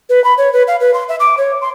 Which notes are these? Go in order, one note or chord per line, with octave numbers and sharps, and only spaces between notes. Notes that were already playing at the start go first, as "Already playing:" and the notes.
B4
B5
C#5
B4
F5
B4
C6
E5
D6
C#5
C6